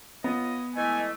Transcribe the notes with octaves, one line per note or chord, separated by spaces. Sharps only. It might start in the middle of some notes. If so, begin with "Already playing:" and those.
B3 F4 C#5 D#5
E3 G#3 A3 D#5 G#5